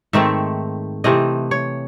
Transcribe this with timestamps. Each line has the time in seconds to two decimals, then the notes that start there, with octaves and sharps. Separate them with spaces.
0.13 G#2 D#3 A3 C4 E5
1.04 C3 E3 A3 C4 D#5
1.51 C#5